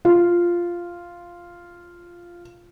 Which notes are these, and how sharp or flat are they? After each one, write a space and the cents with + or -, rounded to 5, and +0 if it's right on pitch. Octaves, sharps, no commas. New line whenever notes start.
F4 -5